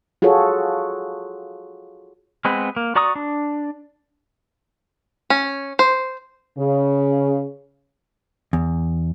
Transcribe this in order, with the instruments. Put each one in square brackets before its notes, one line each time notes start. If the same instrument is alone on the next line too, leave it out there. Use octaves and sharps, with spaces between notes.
[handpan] F4 F#4 G#4 A4 C#5
[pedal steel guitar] G#3 B3 C4 B4
A#3
F#4 D5 A#5 C#6 D#6
D4
[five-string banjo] C#4
C5
[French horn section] C#3
[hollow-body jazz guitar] E2